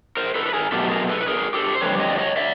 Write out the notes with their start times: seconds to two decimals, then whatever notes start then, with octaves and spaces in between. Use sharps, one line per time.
0.17 A#4 C5
0.35 A4 B4
0.46 B4
0.53 G#4 A#4
0.72 B2 F#3 A3 G4 A4
0.90 G#4 A#4
1.09 A4 B4
1.21 B4
1.27 G#4 A#4
1.54 G4 A4
1.75 C5
1.81 F2 D3 G3 B4 C#5
2.00 C#5 D#5
2.10 D5
2.18 C#5 D#5
2.37 D5 E5